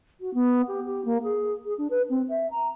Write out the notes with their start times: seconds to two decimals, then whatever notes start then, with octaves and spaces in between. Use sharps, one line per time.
0.20 F#4
0.33 B3
0.67 G4
0.86 G4
1.05 A#3
1.23 G#4
1.64 G#4
1.78 D4
1.90 B4
2.09 C4
2.28 E5
2.50 A#5